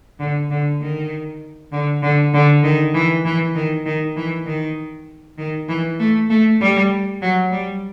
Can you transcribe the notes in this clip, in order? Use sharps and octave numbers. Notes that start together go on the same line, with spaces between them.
D3
D3
D#3
D3
D3
D3
D#3
E3
E3
D#3
D#3
E3
D#3
D#3
E3
A3
A3
G3
F#3
G3